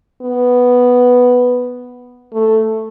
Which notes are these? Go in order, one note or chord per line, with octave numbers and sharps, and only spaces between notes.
B3
A3